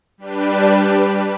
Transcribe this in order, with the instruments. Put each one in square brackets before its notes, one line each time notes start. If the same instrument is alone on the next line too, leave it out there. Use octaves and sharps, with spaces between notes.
[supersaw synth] G3 D4 G4 B4